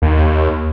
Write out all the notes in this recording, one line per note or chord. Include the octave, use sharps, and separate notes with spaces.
D#2